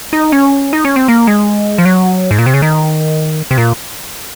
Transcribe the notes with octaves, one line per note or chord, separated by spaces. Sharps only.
D#4
C#4
D#4
C#4
C4
A#3
G#3
F3
F#3
G#2
A#2
C3
C#3
D#3
C3
A#2